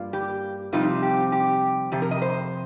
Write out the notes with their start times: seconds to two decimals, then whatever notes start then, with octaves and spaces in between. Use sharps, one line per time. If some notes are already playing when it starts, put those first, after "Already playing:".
Already playing: G2 G3 A#3 F4
0.13 G4
0.72 F2 C3 G3 C4 D#4 F4
1.02 G4
1.32 G4
1.92 F2 C3 G4
2.02 A#4
2.11 D#5
2.22 C5